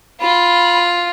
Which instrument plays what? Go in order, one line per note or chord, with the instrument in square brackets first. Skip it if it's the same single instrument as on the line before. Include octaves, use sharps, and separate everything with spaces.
[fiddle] F4 [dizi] B5